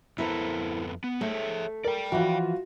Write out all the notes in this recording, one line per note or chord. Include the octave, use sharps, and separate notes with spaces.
F2 B3 E4 A4 A#4 C5
B3
A3 G#4 C#5 E5
A#4 D5 G5
E3 F3 F4 F#4